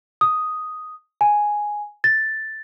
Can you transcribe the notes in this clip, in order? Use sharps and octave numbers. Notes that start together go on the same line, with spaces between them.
D#6
G#5
A6